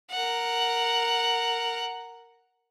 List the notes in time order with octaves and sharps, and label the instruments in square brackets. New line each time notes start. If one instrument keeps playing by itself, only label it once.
[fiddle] A#4 F#5